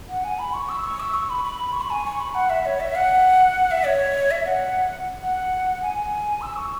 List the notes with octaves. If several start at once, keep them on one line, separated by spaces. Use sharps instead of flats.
F#5
G#5
B5
C#6
E6
C#6
E6
C#6
B5
B5
C#6
B5
G#5
C#6
B5
F#5
E5
C#5
E5
F#5
E5
C#5
E5
F#5
F#5
G#5
E6
C#6